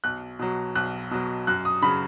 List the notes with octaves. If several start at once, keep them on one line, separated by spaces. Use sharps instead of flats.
B1 F#6
B2 F#3
B1 F#6
B2 F#3
F#2 F#6
D#6
C#3 F#3 B5